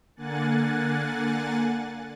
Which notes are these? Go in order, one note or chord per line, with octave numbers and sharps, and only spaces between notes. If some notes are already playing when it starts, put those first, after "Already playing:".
D3 A#3 F#5 G#5 F#6 A6